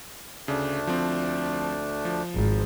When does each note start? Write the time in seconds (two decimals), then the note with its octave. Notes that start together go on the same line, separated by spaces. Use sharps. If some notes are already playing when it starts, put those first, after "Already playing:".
0.48 D2 C#3 A3 D4
0.87 F3 C4
2.05 F3
2.34 G#1